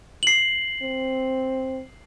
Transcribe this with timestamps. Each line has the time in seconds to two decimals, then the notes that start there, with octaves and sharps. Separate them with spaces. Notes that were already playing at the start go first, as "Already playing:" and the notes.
0.23 C7 F#7
0.82 C4